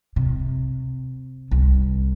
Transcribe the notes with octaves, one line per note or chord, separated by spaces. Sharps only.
C3
C2